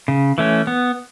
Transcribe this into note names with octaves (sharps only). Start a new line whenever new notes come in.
C#3
E3 A3 C#4
B3